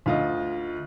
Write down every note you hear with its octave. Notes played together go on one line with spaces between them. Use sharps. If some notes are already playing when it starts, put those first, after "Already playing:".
D2 F4 D#5